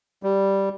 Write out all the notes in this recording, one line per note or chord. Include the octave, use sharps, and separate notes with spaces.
G3